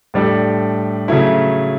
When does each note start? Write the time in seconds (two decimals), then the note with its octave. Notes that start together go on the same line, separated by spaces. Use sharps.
0.14 A2 G3 D4 A4
1.08 C#3 F#3 A3 E4